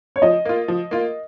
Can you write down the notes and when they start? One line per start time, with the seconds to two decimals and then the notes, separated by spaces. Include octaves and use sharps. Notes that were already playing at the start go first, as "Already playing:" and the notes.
0.16 C#5
0.22 F3 D#5
0.45 A#3 F4
0.68 F3
0.91 A#3 F4